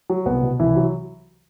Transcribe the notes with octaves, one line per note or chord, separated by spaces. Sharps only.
F#3
C2 B3
B2
C2 E3 E4
F#3